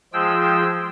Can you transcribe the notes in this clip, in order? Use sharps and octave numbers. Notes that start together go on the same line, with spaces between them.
F3 G#3 F4 G#4 G5 E6